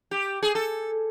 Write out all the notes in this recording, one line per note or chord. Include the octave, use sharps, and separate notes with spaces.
G4
G#4
A4